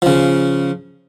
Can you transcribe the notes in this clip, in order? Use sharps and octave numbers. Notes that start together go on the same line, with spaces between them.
C#3 F3